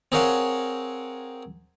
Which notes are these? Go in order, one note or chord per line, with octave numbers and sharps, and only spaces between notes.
C4 G#4 A#4 C#5 F5 F#5